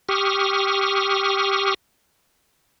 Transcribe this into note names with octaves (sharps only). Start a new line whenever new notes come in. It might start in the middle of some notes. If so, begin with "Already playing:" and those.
G4 C#6 D#6 F6